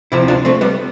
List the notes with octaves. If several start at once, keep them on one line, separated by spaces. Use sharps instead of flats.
D2 C3 F3 C4 E4
D4 F4
A3 C4
G3 B3